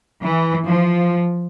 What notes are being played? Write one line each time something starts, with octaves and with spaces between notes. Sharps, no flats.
E3
F3